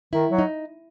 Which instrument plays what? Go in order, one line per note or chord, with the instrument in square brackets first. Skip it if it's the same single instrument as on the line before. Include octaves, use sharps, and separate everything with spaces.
[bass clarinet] D#3 [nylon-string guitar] E4
[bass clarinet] F#3
[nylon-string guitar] D#4